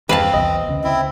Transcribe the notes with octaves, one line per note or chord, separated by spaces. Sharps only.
E2 G2 C4 B4 F5 A5
B1 E2 B2 D#5
D2 C#3
C4 E4